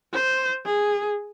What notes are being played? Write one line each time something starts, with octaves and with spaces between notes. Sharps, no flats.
C5
G#4